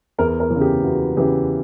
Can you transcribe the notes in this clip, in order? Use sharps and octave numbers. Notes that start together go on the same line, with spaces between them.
E2 A#4
A#4
E3
C#3
G4
E2 F#4
C#3 E3 G4